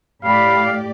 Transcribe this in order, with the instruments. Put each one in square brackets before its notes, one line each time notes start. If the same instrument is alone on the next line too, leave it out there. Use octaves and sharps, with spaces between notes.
[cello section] A2 G4 D5 [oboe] F5 [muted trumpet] B5